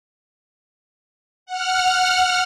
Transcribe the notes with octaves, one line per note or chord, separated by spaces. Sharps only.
F#5 F6